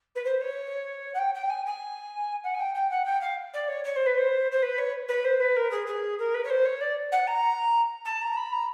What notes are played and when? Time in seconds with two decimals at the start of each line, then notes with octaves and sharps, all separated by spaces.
0.15 B4
0.24 C5
0.40 C#5
1.14 F#5
1.18 G5
1.34 G5
1.49 G#5
1.65 G#5
2.43 F#5
2.54 G#5
2.59 G5
2.74 G5
2.90 F#5
3.05 G5
3.20 F5
3.53 D5
3.68 C#5
3.84 C#5
3.95 C5
4.06 B4
4.17 C5
4.51 C5
4.62 B4
4.77 C#5
5.08 B4
5.24 C5
5.39 B4
5.56 A#4
5.71 G#4
5.86 G#4
6.18 A#4
6.34 B4
6.43 C#5
6.49 C5
6.65 C#5
6.80 D5
7.11 F#5
7.27 A#5
8.04 A5
8.21 A#5
8.36 B5
8.52 A#5